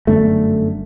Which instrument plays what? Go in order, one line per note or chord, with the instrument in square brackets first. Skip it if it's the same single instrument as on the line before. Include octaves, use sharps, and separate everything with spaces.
[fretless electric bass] G1 F#2 D3 A3